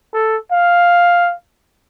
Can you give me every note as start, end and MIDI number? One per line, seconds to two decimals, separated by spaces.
0.14 0.37 69
0.52 1.34 77